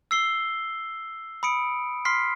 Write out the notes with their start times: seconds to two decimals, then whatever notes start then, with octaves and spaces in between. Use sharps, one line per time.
0.11 E6 C7 G7
1.43 B5 D#6 C#7 D7
2.05 C6 F6 B6 C7